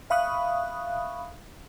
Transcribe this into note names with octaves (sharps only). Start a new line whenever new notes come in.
E5 F5 B5 C#6 D#6 F#6